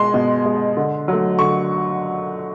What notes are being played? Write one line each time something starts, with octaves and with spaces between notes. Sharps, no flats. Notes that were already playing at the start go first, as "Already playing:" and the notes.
Already playing: B2 G#3 C6
B2
G#3
D3
F#3 A3
D3 C#6